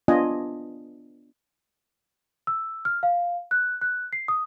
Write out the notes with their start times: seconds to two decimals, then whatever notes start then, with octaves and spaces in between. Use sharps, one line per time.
0.08 B3 D4 F4 D#5 G#5
2.47 E6
2.85 F6
3.03 F5
3.51 F#6
3.81 F#6
4.13 C7
4.28 D#6